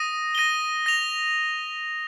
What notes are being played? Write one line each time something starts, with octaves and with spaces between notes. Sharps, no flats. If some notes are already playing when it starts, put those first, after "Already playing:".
Already playing: D#6 A#6 D#7
A#6 D#7 G7
A#6 F7